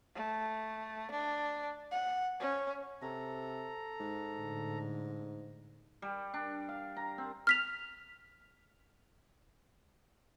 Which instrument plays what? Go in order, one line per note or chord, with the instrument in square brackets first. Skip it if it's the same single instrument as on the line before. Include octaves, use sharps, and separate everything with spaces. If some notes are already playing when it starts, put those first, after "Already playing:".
[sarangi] A3
D4
F#5
C#4
[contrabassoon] C3 [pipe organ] A4 A#5
[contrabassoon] G#2
[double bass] A2 D3
[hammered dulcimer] G3
D4
F5
A#5
C4
[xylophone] F6 B6 F7